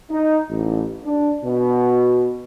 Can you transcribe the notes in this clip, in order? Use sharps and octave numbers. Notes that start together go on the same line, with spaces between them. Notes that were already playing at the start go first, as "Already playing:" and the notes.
D#4
A1
D4
B2